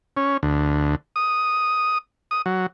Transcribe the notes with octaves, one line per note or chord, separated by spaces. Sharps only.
C#4
D2
D#6
D#6
F#3